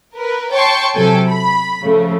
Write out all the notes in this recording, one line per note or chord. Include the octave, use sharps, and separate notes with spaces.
A#4 B4
C#5 G5 A5 C6 C#6
C3 F#3 A4 G5 G#5
B5
C#3 F3 A3